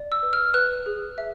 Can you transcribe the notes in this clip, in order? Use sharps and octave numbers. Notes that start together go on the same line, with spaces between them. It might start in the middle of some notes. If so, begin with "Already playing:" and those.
Already playing: D5
E6
B4
F6
B4 F#6
G#4
E5